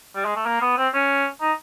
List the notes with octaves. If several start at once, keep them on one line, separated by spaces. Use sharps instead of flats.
G3
G#3
A3
A#3
B3
C4
C#4
D#4